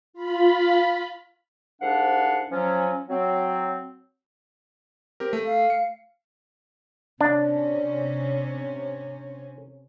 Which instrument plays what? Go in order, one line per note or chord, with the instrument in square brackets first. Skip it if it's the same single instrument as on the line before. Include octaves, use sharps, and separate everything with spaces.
[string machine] F4 B5
[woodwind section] C2 G#2 D4 F5 F#5
F3 F#3 C#4
F#3 C4
[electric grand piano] C4 G4 A#4
A3
[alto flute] F5
[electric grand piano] C#7
[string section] C3 C#4 [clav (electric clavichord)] D4